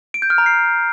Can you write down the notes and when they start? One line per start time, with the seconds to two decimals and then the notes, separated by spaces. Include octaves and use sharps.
0.14 D7
0.22 G6
0.30 F6
0.38 A#5
0.46 C7